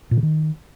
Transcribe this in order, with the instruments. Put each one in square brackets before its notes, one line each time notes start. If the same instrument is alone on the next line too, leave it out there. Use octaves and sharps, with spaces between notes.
[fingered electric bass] A#2
D3
D#3